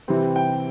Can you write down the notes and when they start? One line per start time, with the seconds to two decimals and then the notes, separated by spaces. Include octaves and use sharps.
0.08 C3 E3 G3 C4
0.36 G5